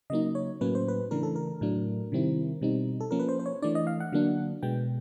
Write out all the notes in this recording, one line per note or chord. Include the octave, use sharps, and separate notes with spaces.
C#3 F#3 A#3 D#4 D#5
C#5
A2 F#3 A#3 C#4 B4
C5
B4
C#3 E3 A3 D4 A#4
A4
A#4
A2 F#3 A3 D4
C3 D#3 G3 C4 E4
B2 G3 C4 D#4
A4
F3 A#3 C#4 A#4
B4
C5
C5
C#5
E3 A3 D4 D5
D#5
F5
F#5
D3 F#3 A#3 D4
B2 G#3 B3 G5